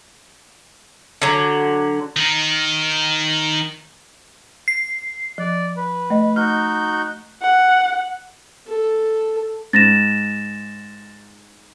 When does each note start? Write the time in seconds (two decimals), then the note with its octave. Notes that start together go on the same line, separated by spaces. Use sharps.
1.22 D3 F#3
2.17 D#3 D#4
4.68 C7
5.38 F3 D5
5.76 B4
6.10 A3 D#5
6.36 D#4 F#4 F6 G6
7.42 F#5
8.68 A4
9.73 G#2 A6 A#6 E7